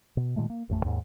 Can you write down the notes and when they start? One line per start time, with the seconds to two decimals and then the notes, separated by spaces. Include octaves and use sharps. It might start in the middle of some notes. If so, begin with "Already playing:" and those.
0.17 B2
0.36 A#2 D#3 G#3 A3
0.50 A#3
0.69 A1 F2 A3
0.84 D#2 G#2